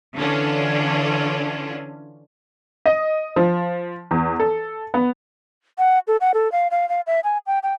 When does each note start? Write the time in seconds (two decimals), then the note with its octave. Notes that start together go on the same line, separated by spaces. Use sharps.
0.16 D3 E3 C#4 D4 F4
2.86 D#5
3.36 F3
4.11 E2
4.40 A4
4.94 B3
5.78 F#5
6.07 A4
6.20 F#5
6.34 A4
6.52 F5
6.71 F5
6.89 F5
7.07 E5
7.24 G#5
7.47 G5
7.63 G5